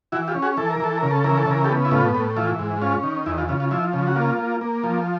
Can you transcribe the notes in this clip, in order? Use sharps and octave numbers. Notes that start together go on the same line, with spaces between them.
E3 E4 F#4
F4 G4
C#4
F#4 G#4
E3 A4
A#4
E3 A4
C#3 A#4
A4
E3 A#4
A4
C#3 A#4
G4 A4
B3
E4
A2 F4
A2
E3 F4
G#2
C#4 F4
D#3
E2 E4
F4
C#3 F4
F4
F3 E4
C#3
F#4
A#3 F4
A#3
A#3
F3